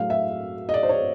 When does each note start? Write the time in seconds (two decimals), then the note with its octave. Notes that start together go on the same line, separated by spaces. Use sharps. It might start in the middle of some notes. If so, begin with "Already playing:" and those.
Already playing: A2 F#3 F5
0.10 E5
0.69 D#5
0.74 D5
0.83 C5
0.89 C#5